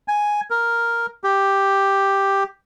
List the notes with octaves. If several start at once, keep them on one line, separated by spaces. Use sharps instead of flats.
G#5
A#4
G4